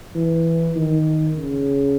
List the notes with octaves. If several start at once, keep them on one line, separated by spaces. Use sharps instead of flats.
E3
D#3
C#3